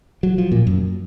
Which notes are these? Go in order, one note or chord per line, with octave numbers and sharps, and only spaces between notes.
F#3
F3
A#2
F#2